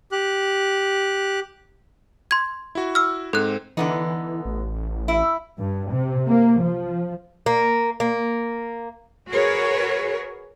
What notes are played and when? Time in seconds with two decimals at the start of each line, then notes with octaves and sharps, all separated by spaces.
0.12 G4 F#6
2.31 C6 G#6
2.75 E4 F#4
2.95 E6 F6
3.33 G#2 C4 A4 F#6
3.77 D3 E3 B3 D#4
4.45 A1
5.08 E4
5.57 G2
5.92 C3
6.27 A#3
6.60 F3
7.46 A#3
8.00 A#3
9.29 F#4 G#4 A#4 B4 C#5